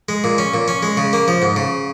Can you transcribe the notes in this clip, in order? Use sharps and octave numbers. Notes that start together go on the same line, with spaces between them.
G#3
A#2
C#4
A#2
C#4
G#3
C#3
A#3
F3
G#2
C#3